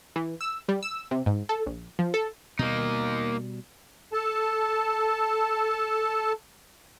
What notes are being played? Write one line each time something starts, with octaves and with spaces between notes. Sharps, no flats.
E3
E6
G3
E6
C3
G#2
A4
A#1
F3
A4
B2 G3 A#3 D#4
A4 A5